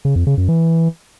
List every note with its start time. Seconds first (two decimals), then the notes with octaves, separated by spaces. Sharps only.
0.05 C#3
0.16 F2
0.27 C#3
0.38 F#2
0.48 E3